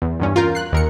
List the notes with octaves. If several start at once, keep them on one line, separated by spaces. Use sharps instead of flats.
E2
E2 G2 C#4
F4 A#4 G6
F#6 C7
D#2 A#4 C#7